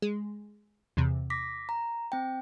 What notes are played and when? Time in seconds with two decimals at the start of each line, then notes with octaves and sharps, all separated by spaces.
0.02 G#3
0.97 E2 C3
1.30 D6 A#6 B6
1.69 A#5
2.12 C4 G5